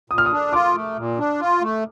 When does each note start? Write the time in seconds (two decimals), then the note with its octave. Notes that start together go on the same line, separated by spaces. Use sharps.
0.10 A#2 D#6
0.18 F6
0.26 D#6
0.32 D4
0.53 F4 D6
0.75 A3
0.97 A#2
1.18 D4
1.41 F4
1.62 A3